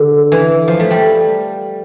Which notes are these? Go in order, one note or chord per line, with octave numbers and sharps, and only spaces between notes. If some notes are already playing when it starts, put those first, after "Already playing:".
Already playing: D3
E3
F3
A3
G3